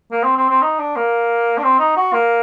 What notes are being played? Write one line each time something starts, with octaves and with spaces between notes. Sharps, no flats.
A#3
C4
C4
C4
D#4
D4
A#3
D4
C4
D#4
F#4
A#3